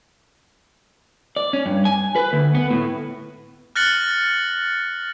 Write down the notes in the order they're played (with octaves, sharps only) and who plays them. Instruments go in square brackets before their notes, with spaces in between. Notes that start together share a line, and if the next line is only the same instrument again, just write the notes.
[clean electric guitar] D5
C#4
G2
G#5
B4
D2
B3
A2
[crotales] F6 F#6 A6 A#6 C#7 F#7